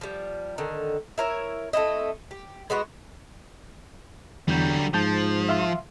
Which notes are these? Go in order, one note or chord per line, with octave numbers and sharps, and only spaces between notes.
F3 G3
D3 D#3
E4 A#4 C#5
A3 C4 E4 D#5
G4
G#3 B3 F#4 B4
E2 D3 F#3 G3 G6
G#2 F3 A5 G6
E5 F5 C6